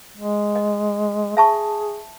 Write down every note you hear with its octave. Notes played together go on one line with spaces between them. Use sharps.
G#3
D#5
G#4 E5 A5 C#6